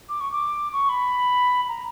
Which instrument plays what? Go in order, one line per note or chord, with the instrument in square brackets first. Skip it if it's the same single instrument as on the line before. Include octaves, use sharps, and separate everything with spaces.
[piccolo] D6
C#6
D6
C#6
B5
A#5